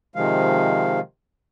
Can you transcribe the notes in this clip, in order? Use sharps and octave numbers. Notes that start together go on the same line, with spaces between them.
C3 D#3 F3 G#3 F5